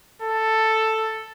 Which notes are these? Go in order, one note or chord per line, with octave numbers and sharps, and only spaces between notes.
A4